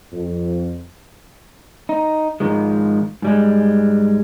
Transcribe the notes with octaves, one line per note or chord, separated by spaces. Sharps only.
F2
D#4
G#2 D#3 F3 G#3
G#2 G3 G#3